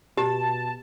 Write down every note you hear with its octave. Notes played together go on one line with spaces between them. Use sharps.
B2 G4 A5